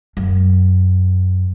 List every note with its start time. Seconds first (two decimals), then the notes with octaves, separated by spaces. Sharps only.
0.17 F#2